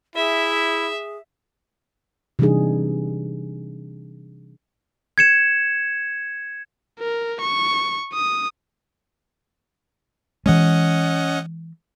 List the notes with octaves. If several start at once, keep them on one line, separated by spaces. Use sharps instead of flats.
E4 G#4 E5
C3 E3 G3 D4 D#4 G#4
G#6 C#7 E7
A#4
C#6
D#6
E3 G#3 C#4 D#5 F#5